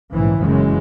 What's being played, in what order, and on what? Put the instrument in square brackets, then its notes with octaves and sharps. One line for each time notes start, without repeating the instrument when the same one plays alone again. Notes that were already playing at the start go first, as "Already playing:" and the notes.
[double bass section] A#1 G#2 C#3 E3
F#1 F#2 C#3 E3 G#3